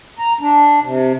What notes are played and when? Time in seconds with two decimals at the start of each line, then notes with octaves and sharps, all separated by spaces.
0.19 A#5
0.41 D4
0.84 C3